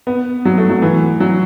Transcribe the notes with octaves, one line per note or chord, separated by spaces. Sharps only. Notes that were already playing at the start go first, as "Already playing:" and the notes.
B3
F#3
A3
F#3
E3
F#3